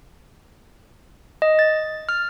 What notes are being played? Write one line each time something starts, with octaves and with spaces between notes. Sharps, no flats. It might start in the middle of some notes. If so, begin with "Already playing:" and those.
D#5
A6
F6